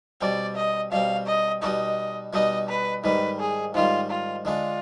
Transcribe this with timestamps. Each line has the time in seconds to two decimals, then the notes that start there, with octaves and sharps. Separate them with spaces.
0.21 B2 G3 C4 D5
0.56 D#5
0.91 B2 G3 C4 F5
1.26 D#5
1.62 B2 G3 B3 D#4 D#5
2.33 B2 G3 B3 D#4 D#5
2.69 B4
3.04 G#2 D#3 G3 B4
3.40 G#4
3.74 G#2 D#3 G3 F4
4.10 F4
4.45 D3 G#3 D4 F4